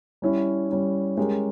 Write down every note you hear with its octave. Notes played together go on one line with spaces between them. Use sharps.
G3 C#4 E4
G3 C#4 E4
G#3 C#4 G4 A#4